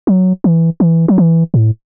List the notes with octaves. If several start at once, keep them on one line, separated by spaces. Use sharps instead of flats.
F#3
E3
E3
F#3
E3
A2